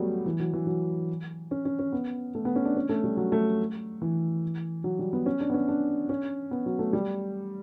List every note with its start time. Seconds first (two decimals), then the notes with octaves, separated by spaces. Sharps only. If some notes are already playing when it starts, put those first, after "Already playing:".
Already playing: F#3 G3 A3 B3
0.26 E3
0.40 F#3
0.53 E3
0.67 F#3
1.51 C#4
1.65 C#4
1.79 C#4
1.92 B3
2.35 A3
2.45 B3
2.56 C#4
2.65 D4
2.77 C#4
2.89 A3
3.04 G3
3.17 F#3
3.32 A3
4.02 E3
4.84 F#3
4.99 G3
5.13 B3
5.26 C#4
5.41 D4
5.50 B3
5.54 C#4
5.68 D4
6.09 C#4
6.51 B3
6.66 F#3
6.79 A3
6.93 G3